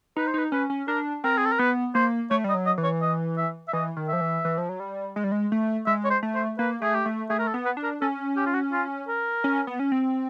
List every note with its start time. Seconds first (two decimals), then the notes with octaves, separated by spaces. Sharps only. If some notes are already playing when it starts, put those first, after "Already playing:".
0.17 D#4 B4
0.27 C5
0.34 D#4 B4
0.52 C#4 B4
0.70 C#4
0.88 D4 A#4
1.24 C4 A#4
1.38 G#4
1.45 A4
1.52 A#4
1.59 B3 B4
1.95 A#3 C5
2.30 A3 C#5
2.44 G3 D#5
2.55 F#3
2.66 D#5
2.78 E3
2.84 C#5
3.02 D#5
3.37 E5
3.68 E5
3.73 E3 D#5
3.97 D#3
4.08 F3 E5
4.21 E3
4.45 E3
4.58 F3
4.69 F#3
4.80 G3
5.16 G#3
5.24 G3
5.32 G#3
5.52 A3
5.87 G#3 E5
6.05 C#5
6.10 C5
6.23 A3
6.35 C5
6.58 A#3 B4
6.82 A3 G#4
6.94 G4
7.06 A3
7.30 A3 G#4
7.39 A#4
7.48 A4
7.54 B3
7.65 B4
7.77 D4
7.83 A#4
8.01 C#4 A4
8.37 G4
8.46 F4
8.54 F#4
8.72 F4
9.08 A#4
9.44 C#4
9.67 B3
9.79 C#4
9.92 C4